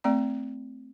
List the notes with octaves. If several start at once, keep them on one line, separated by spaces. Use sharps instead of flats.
A3 C4 D5 A#5